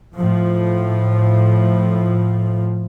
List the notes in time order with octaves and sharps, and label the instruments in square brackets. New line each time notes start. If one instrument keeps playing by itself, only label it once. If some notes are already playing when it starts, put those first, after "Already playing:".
[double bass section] A2 F3